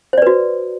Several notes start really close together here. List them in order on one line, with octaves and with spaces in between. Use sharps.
C5 D5 B4 F#4